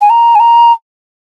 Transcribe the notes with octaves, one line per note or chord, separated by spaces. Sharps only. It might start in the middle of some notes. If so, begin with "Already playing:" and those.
G#5
A#5
G#5
A#5